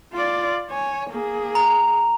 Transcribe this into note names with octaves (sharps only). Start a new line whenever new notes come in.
F4 D5
C#5 G#5
A#3 G#4
A#5